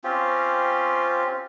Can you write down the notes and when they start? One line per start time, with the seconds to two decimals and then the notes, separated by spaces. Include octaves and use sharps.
0.04 C4 C#4 F4 G4